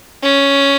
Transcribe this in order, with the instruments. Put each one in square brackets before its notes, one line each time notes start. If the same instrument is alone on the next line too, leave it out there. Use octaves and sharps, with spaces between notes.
[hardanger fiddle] C#4